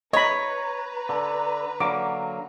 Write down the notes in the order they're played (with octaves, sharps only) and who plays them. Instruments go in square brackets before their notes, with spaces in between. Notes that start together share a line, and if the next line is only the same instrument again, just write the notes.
[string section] B4 A#5 [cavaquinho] C#5 [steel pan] D#5 B5
[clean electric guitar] D3
[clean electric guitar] D3 F#3 A#3 [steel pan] D6